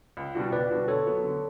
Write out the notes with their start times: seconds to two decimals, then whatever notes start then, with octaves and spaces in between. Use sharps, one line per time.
0.17 C#2
0.35 B2 G3 D4 F#4
0.52 C#2 B4 D5
0.71 B2 G3 D4 F#4
0.88 D3 A4 C#5
1.06 F#3 B3 F#4
1.24 D3